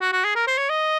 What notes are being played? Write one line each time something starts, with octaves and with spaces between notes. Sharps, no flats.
F#4
F#4
G#4
A#4
C5
C#5
D#5